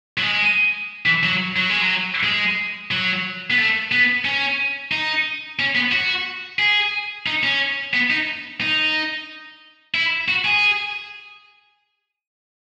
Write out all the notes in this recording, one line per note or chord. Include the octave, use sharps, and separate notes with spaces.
F#3
G#3
E3
F#3
F#3
G#3
F#3
G#3
F#3
B3
A3
B3
C#4
D#4
C#4
B3
F#4
G#4
D#4
C#4
B3
D#4
D#4
E4
F#4
G#4